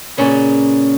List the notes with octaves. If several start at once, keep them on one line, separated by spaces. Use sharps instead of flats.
A#2 C#3 C#4 B4